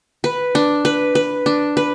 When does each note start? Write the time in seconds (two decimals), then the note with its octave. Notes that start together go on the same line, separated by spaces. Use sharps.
0.24 B4
0.55 D4
0.85 B4
1.15 B4
1.46 D4
1.77 B4